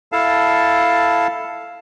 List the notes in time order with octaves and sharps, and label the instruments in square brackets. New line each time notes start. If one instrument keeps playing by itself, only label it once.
[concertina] E4 A4 F5 A5